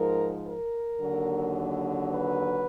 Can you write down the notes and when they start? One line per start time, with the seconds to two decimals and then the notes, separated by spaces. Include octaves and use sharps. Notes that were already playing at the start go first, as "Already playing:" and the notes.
Already playing: G#2 F3 A#4
0.45 A#4
0.99 D#2 D3 F#3
2.09 B4